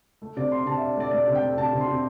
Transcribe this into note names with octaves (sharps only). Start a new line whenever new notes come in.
A3
C3 D5
D4 C6
C3 A5
D4 E5
A3 D5
A3 D5
C3
G5
A3
C3 A5
C3
C6
C3